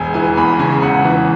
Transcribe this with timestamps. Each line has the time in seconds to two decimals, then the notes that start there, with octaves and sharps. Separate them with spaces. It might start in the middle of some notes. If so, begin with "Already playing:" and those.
Already playing: E1 G#5
0.14 E3 G#5
0.37 E2 B5
0.59 C#3 G#5
0.82 E1 F#5
1.05 E3